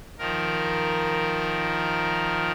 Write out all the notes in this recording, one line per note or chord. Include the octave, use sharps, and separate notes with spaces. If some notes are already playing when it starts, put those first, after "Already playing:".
D#3 F3 A#4